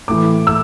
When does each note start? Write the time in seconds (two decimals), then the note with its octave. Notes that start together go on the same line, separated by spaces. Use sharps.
0.08 A2 E3 D6
0.47 E6